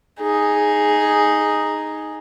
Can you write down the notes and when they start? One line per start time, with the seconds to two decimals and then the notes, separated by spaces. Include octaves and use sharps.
0.21 D#4 G#4